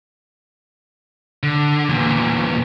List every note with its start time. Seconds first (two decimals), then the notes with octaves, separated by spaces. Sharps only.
1.43 D3
1.89 E2 A#2